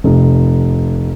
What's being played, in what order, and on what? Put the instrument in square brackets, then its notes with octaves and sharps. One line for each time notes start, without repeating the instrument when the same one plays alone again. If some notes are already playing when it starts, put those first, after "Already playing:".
[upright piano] F1